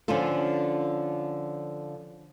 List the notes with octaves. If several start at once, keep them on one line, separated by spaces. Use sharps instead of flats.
D3 F3 C#4 D4 F4 A4